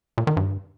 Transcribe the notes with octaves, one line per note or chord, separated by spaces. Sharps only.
A#2
D#3
G2